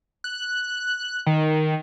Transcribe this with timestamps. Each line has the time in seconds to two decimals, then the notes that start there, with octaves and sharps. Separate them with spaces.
0.24 F#6
1.26 D#3